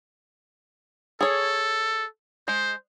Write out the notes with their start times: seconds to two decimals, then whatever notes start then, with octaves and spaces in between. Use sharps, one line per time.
1.21 G#4 A4 C#5
2.48 G#3 C5